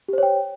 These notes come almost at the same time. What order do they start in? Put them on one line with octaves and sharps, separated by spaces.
G4 C5 C#5 G5